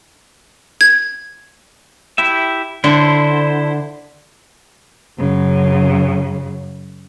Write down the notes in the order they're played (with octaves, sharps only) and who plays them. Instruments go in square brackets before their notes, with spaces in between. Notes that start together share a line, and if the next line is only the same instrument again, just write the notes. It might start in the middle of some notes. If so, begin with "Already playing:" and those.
[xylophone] G#6
[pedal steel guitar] E4 G4 E5
[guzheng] D3 [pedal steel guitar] E4 C5
[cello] F#2 C#3